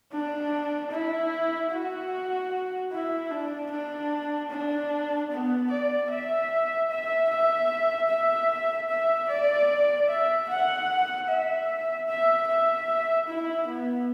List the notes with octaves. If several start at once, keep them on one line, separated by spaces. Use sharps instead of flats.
D4
E4
F#4
E4
D4
D4
D4
B3
D5
E5
E5
E5
E5
E5
D5
E5
F#5
E5
E5
E5
E4
B3